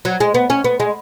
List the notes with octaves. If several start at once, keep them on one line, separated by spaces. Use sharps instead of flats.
F#3
G#3
B3
C#4
B3
G#3